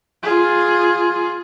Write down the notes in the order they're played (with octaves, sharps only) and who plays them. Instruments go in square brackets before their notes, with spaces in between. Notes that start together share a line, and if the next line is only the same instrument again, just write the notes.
[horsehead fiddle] F4 G#4